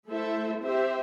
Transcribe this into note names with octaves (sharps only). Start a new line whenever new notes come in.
A3 E4 A4 C5 E5
C4 G4 C5 E5